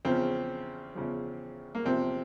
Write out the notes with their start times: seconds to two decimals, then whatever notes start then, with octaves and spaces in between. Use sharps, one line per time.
0.05 E2 C#3 F3 C4
0.95 E2 C#3 F3
1.75 A#3
1.85 E2 C3 F3 C4